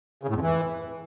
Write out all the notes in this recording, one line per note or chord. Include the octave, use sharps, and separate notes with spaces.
C#3
A2
F2
E3